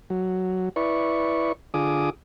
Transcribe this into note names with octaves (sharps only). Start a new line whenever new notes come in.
F#3
E4 B4 D5 C#6
D3 F4 G#4 D6 D#6